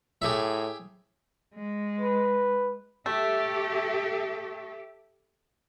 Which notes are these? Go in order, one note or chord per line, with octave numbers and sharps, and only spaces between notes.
A2 G4 G#4 E5
G#3
B4
A3 G4 A4 E5